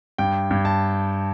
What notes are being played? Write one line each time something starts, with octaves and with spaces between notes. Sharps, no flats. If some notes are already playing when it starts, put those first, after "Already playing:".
G2 G5
G2
A5